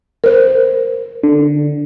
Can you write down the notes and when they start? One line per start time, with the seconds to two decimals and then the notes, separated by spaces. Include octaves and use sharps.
0.24 A#4 C5
1.23 D3